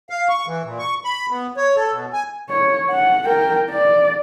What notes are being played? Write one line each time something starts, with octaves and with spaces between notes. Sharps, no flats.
F5
C#6
E3
A#2
C#6
B5
B3
C#5
A4
B2
G#5
C#5
F#5
A#4 G5
D5